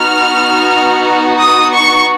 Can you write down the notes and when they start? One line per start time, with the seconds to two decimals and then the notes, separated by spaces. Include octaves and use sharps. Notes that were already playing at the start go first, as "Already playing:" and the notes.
Already playing: B3 D#4 F#4 F6
1.40 D#6
1.72 C#6